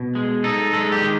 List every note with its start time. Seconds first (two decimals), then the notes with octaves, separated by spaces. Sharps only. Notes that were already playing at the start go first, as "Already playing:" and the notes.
Already playing: B2
0.15 G#3
0.44 D#4 A4
0.73 G#3 A4
0.92 G4
1.02 D#3